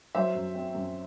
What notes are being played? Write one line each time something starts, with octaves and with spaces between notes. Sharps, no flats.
F#3 C5 E5
F#2
C4
F#2